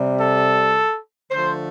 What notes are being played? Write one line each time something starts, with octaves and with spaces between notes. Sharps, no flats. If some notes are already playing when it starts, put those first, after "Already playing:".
Already playing: C3 G3
A4
D3 F3 A3 C5